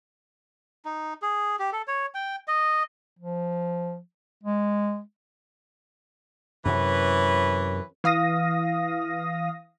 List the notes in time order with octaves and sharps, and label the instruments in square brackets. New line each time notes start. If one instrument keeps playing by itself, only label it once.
[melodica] D#4
G#4
G4
A4
C#5
G5
D#5
[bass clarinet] F3
G#3
[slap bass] F#2 C3 [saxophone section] E3 B4 C#5
[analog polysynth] E3 F5 D#6 A#6